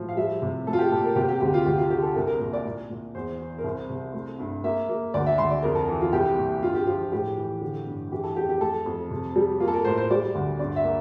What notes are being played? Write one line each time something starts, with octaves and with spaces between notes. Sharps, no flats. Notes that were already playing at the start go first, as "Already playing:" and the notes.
Already playing: A2 F3
F5
G3 E5
C3
A3 A4
F4
G4
A#2 A4
A#4
C3 G4
G4
D2 G4
F4
D2 G4
F4
D3 G4
A4
C2 A#4
A#4
A#2 A#4
D5
A#2
A#2
E2 C5
E3
A#4
C2 C5
C3
A3
G2
A#3 E5
A#3
D2 D5
E5
D2 C6
D5
F2 A#4
A4
E3
F4
C2 G4
A#2
G2 F4
G4
F3 F4
A2 G4
E3
D3
G2
E3 G4
A4
F2 G4
G4
A3 A4
F2
C3
G3
A#3 F4
A4
A#4
A2 C5
C5
G3 D5
D2
G2 D5
E5
A#3